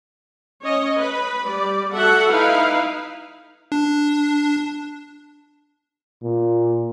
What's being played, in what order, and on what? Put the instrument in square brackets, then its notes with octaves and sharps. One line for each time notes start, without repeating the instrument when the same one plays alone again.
[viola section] C#4 C#5 D#5
B4 B5
G3 D5
F#4 A4 E5 F#5
D#4 E4 B4 F5
[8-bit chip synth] D4
[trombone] A#2